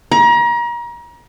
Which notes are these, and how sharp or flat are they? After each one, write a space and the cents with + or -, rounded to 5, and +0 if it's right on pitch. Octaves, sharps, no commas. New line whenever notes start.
A#5 +35